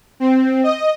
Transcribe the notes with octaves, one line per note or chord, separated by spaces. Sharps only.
C4
D#5